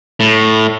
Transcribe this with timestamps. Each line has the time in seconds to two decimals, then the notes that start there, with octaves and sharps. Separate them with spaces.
0.20 A2